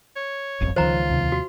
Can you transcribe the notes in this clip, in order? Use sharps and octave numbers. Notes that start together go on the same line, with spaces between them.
C#5
D1 G1 F2
C#2 D#3 F3 F4 C5 A#5
D#2 C3 F3
F#4